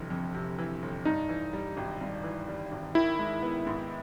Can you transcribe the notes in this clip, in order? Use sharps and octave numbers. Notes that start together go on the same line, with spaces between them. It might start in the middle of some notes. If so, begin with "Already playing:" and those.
Already playing: G1 F2 C3 E3
F2
C3
E3
G1
G2 D#4
E3
G3
G#1
G2
E3
G3
G#1
D#3 E4
G#3
B3
G#2